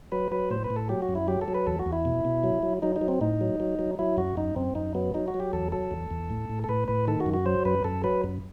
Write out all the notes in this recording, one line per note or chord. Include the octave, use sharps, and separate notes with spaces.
F#3 B4
F#3 B4
A2 C5
B4
A2
A4
F#3 G4
F#4
F#2
E4
F#3 G4
A4
F#3
B4
E2 A4
F#4
E2
E4
B2
B2
F#3
F#3
F#3 D#4
D#4
F#3
C4
A2 D#4
F#3
F#3
F#3
F#3 E4
F#2 F#4
F#2 D#4
F#2 C4
F#2 D#4
F#3 B3
F#3 D#4
F#4
F#3
G4
E2 A4
F#3 A4
E2
E2
A2
A2
A4
A2 B4
A2 B4
D#3 A4
F#4
F#2
F#4
F#3 C5
F#2 B4
F#2 A4
F#3 B4
F#2